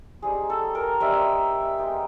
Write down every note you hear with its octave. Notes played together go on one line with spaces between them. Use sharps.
G3 C4 D#4 G#4
A4
A#4
G3 C4 D#4 E5
G#3 B3 D#4 G5